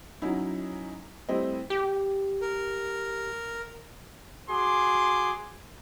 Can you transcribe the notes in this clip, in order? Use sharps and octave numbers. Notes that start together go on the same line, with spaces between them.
F#3 C#4 D#4 E4
G3 A3 C4 E4 C5 D#5
G4
A#4
F#4 G#4 C6 D6